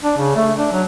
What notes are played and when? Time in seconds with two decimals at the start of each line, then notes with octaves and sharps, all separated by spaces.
0.03 D4
0.18 C#3
0.36 A3
0.58 D4
0.72 F#3